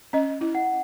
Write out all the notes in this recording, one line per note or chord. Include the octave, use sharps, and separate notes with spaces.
C#4 D#5
E4
F#5